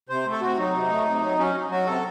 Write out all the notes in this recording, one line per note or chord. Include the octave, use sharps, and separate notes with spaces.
C3 C5
A3
A4
C3 F#4
F#3 D#4
C3
A3
C3
F#3
F#3 C#4
F#3
F#3 F#4
C3 A4